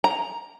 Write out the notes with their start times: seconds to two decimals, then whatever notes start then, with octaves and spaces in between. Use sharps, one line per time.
0.04 A#5